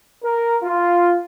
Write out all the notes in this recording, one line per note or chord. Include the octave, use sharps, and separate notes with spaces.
A#4
F4